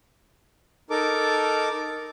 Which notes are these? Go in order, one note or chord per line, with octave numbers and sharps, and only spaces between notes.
D#4 A4 A#4 D6